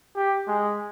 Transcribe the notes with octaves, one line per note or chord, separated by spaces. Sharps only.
G4
G#3